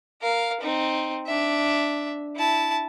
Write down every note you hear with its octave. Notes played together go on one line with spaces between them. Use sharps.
A#4 F5
C4 D#4
D4 E5
E4 A5